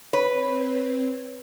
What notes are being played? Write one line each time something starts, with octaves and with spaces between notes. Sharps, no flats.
C4 B4 C#5